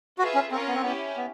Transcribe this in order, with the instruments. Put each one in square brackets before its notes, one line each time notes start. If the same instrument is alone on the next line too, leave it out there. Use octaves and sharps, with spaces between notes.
[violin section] F4 G#4 B4 E5 [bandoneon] F#4
[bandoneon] C#4
[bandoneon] C4 [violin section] C#4 F4 A#4 C#5
[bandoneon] B3
C4
[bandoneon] B3 [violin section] C#4 E4 G4
[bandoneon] B3